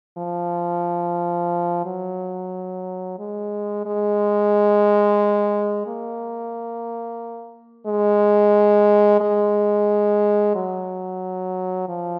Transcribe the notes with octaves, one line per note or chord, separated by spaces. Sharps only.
F3
F#3
G#3
G#3
A#3
G#3
G#3
F#3
F3